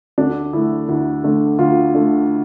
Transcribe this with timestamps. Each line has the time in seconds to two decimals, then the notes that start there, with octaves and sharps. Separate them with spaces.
0.18 D2 D4
0.53 D3 A3 E4
0.88 D2 E4
1.24 D3 A3
1.59 D2 F4
1.94 D3 A3